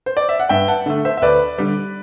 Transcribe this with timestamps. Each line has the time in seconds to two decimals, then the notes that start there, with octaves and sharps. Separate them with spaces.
0.06 C5
0.17 D5
0.29 E5
0.40 F#5
0.49 G2 E5 G5
0.68 F#5 A5
0.86 D3 A3
1.05 C5 E5
1.17 E5
1.22 D2 B4 D5
1.58 D3 G3